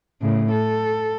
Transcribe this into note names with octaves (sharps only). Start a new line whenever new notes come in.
A2 C#3
A4